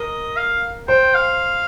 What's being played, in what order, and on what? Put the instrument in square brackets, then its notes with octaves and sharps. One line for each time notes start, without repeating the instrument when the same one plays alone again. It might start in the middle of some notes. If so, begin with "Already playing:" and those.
Already playing: [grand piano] A#4 [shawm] D#5
[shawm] F5
[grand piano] C5 [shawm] G5
[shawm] F5